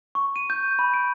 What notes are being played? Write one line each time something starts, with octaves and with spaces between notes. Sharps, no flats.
C#6
D#7
G6
B5
D7